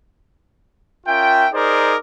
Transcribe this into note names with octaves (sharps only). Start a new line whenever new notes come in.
C#4 F4 A#4 E5 G5
D#4 G#4 A#4 C5 D5 D6